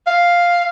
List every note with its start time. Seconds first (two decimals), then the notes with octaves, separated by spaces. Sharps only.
0.07 F5